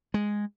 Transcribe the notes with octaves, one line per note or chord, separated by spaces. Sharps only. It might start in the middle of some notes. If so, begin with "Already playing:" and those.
G#3